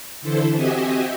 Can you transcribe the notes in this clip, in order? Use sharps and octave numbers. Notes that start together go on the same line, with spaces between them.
D3 E3 E4 A4 C5
C4 F#4 G4 D#5 E5 G#5